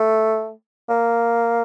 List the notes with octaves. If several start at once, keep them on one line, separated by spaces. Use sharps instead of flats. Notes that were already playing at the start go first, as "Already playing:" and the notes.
Already playing: A3
A#3